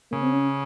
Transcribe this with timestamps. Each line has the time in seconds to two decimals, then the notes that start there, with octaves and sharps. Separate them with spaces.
0.11 C#3 A#3
0.23 C4
0.33 C#4